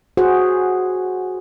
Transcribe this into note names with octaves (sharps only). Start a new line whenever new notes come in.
F#4 G#4 C5 F#5